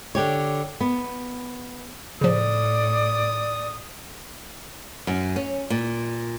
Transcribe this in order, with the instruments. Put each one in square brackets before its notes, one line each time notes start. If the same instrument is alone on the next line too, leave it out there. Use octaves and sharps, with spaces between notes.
[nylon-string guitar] D3 G4 C#5
B3
[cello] A2 [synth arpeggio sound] C#3 F3 [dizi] D5 [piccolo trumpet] D#6
[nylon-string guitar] F#2
C#4
A#2